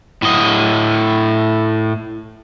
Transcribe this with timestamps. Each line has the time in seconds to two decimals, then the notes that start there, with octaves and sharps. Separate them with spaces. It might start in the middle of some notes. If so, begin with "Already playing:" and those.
0.22 A2 D#5